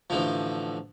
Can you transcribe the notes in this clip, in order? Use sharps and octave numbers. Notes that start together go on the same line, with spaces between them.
A1 D3 F3